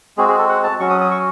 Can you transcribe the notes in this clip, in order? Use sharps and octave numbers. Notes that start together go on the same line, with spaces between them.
G#3 C4 F#4 G#4
G#4
A4
F#5
A5
F#3 C#4 F#4 C#6
D#6
D#6
C#6